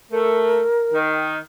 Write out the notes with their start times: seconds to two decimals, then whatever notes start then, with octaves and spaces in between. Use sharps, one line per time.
0.12 A3 A#4
0.93 D#3